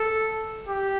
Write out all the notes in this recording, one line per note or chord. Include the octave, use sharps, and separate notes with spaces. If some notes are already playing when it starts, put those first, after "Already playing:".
Already playing: A4
G4